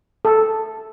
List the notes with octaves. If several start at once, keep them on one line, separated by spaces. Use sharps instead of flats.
A4